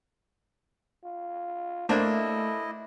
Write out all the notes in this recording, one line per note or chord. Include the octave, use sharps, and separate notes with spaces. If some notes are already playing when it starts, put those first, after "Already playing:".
F4
A3 A#3 D4 E4 A4 C5 D#5